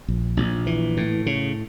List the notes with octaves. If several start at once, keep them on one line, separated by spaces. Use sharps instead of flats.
A#1
A#1
E3
A2
C#3